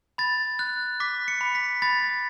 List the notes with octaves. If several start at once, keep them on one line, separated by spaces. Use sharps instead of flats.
B5 A6
F#6
D6 B6
C#7
B5
B6
B5 A6